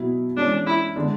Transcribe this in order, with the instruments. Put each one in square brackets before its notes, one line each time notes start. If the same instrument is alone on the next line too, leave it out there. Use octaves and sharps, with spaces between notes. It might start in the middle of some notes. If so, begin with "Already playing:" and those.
Already playing: [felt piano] B2 F#3 B3 E4
[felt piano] E3 G#3 C#4 [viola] D4
[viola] E4
[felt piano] D3 G#3 D4